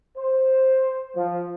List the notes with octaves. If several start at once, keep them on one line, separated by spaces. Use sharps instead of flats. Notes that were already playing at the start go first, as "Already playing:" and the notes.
C5
F3